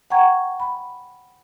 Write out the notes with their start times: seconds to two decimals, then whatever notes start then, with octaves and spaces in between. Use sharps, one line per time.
0.10 F#5 G5 A#5 C#6 G#6
0.60 B5